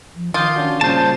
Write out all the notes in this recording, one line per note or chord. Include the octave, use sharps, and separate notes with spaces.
F3
D#3 F4 D6 D#6 G6
C#4 D4 F#4
A#2 C#3 G3 C5 A5